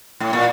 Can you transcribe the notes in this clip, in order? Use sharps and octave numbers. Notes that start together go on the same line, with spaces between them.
A2
A#2